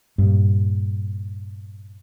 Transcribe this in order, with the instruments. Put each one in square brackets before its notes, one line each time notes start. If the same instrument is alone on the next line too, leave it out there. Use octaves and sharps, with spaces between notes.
[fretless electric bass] G2 A#2